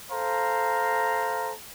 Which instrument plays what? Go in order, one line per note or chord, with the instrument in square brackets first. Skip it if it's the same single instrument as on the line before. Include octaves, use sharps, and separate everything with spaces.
[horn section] A4 C5 F5 A#5